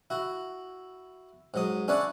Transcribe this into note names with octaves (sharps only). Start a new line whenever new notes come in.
E4 F#4
G#2 F#3 D#6
C#4 D4 E4 C#5 D5 F#5